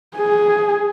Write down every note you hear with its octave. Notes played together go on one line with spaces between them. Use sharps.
G#4